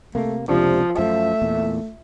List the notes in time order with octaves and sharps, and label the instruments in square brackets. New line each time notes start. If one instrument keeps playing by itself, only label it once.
[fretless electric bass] C3 A#3 [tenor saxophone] A3
[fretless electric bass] F1 C#2 D4 [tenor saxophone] C3 [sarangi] F3
[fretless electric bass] F#2 F3 [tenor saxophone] A3 [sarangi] E5
[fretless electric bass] E2 A#2